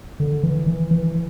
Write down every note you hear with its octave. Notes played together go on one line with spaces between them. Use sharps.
D3
E3
E3
E3